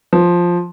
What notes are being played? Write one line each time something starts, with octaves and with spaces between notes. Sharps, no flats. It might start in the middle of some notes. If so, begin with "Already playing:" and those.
F3